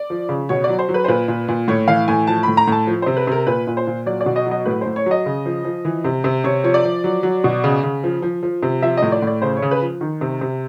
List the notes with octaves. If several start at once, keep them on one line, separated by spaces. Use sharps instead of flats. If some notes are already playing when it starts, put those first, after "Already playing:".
Already playing: D5
F3
C#3
B2 C#5
D5
F#3
C5
F#3
B4
C5
A#2 B4
A#2
A#2
A2 C#5
E3 F5
A2 G#5
F3 A5
A2 B5
A#5
A2 A5
F3
C3 C5
B4
C3 A#4
A#2 B4
A#2
C5
A#2
F#3 D5
D5
B2
D#5
F#3
D#5
A2 B4
A2 C5
C#5
F#3 D#5
C#3
F3
F3
E3
C3
C3
C3 C#5
F3 C#5
D5
F3
F#3
F#3
B2
C#3
C#3
F3
F3
F3
C3
F3 E5
A2 D#5
D5
A2
D5
C#3 C5
C#5
C#3
B4
F3
D#3
C3
C3